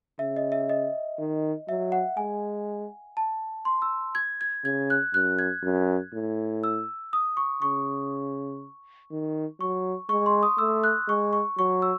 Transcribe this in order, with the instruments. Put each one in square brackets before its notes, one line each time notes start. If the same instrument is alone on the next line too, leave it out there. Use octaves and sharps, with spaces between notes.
[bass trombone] C#3 [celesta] E5
[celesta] D#5
E5
D#5
[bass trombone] D#3
[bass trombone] F#3 [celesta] E5
[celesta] F#5
[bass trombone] G#3 [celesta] G#5
[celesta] A5
C6
E6
G#6
G#6
[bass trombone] C#3 [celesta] G#6
[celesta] F#6
[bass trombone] F#2 [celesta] F#6
[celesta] G#6
[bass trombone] F#2
A2
[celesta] E6
D#6
C#6
[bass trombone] C#3 [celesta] C#6
[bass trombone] D#3
[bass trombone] F#3 [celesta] C#6
[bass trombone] G#3 [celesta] C#6
[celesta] C6
D#6
[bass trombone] A3 [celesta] E6
[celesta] F#6
[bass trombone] G#3 [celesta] C#6
[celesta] C#6
[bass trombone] F#3 [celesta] C#6
[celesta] E6